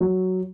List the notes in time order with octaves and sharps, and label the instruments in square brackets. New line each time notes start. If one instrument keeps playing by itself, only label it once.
[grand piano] F#3